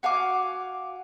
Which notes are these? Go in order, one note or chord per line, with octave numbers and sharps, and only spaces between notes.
F#4 F5 G#5 D6